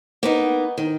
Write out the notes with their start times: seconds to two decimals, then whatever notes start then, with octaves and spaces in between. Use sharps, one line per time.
0.23 A#3 B3 D#4
0.78 D#3